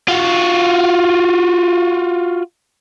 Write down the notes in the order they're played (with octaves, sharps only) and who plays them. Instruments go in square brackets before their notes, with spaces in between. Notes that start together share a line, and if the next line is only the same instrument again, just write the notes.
[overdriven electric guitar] F4 F#4